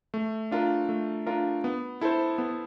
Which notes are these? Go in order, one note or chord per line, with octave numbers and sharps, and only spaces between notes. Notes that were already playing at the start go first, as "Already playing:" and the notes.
A3
D4 F4 A#4
A3
D4 F4 A#4
B3
E4 A4 C5
B3